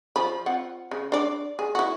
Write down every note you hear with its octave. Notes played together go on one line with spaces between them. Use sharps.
F3 B5
C4 F4 F#5
C#3
D4 D5
G#4
E4 F#4